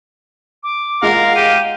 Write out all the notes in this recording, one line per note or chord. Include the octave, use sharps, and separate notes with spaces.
D6
G#3 F4 A#4 F5 F#5
G4 D#7